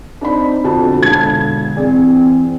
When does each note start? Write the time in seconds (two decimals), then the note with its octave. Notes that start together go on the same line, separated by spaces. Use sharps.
0.21 C4 D4 D#4 B5
0.64 F2 B2 D3 A5
1.03 E1 A5 G#6
1.76 E3 C4 G#4 D5